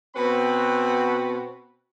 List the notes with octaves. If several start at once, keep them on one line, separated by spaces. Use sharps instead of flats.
B2 C4 F#4 B4 B5